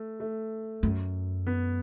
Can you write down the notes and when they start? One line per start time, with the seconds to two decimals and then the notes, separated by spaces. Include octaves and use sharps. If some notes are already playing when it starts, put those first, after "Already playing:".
Already playing: A3
0.20 A3
0.83 F#2
1.47 B3